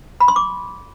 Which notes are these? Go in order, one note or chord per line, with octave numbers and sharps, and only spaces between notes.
B5
C6
D6